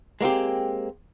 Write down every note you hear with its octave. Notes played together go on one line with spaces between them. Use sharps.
G#3 A#3 C4 G4